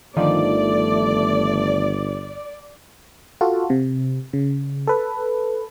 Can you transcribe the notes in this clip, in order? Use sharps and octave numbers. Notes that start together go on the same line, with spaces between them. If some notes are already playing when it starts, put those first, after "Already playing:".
G1 D3 D#3 F3 A3 D5
F4 F#4 A4
C3
C#3
A4 B4